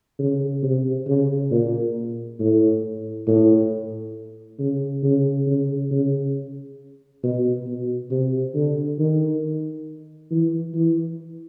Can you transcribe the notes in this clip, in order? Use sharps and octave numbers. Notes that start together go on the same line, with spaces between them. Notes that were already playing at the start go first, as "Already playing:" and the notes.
C#3
C3
C#3
A#2
A2
A2
C#3
C#3
C#3
C#3
B2
B2
C3
D3
D#3
E3
E3